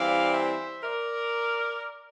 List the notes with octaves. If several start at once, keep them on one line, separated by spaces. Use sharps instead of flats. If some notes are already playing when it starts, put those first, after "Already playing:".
Already playing: E3 G3 C4 D5 F5
C5 E5
A#4 D5